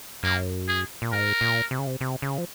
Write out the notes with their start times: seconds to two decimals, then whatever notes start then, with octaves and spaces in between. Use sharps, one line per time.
0.23 F#2 A#3
0.68 G#4
1.02 A#2
1.12 G#2 A#4
1.41 A#2
1.71 C3
1.79 C#3
1.87 C3
2.01 C3
2.22 C#3
2.38 F3